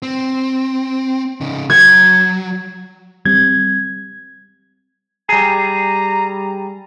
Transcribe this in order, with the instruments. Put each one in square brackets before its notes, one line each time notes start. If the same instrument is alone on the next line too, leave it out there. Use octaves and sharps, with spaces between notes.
[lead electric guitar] C4
C#3 D#4
[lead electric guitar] F#3 [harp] G#6
[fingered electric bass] G3 C4 [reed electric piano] G#6
[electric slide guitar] G3 G#4 [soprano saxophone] A#5